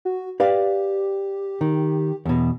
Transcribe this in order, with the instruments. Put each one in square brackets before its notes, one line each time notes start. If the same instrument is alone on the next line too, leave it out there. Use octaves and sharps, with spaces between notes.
[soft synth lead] F#4
[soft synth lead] G4 [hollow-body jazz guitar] B4 D5 F5
[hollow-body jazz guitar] D#3
E2 B2